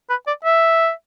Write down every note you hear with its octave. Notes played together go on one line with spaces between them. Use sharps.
B4
D5
E5